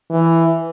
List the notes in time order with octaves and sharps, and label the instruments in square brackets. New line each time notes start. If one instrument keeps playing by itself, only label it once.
[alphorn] E3